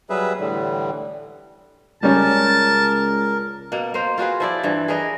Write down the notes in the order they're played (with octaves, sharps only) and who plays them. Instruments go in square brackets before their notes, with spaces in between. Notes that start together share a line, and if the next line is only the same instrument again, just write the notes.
[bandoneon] F#3 G3 G#4 B4 E5
A2 D3 E3 G3
[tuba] C#2 [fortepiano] G3 C#4 [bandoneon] A#4 [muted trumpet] A5
[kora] B2 A#3 F#5
A#3 C5
F4 F#4 G#4 B4
F3 E4 D5
G2 E3
G#4 A#4 B4 D#5